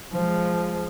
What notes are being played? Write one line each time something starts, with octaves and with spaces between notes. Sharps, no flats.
F3 G#3